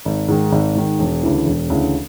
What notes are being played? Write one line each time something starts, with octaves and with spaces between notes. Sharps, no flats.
G#1
G#2 D#3
G#1
G#2 D#3
E1
D2 C#3 E3
E1
D2 C#3 E3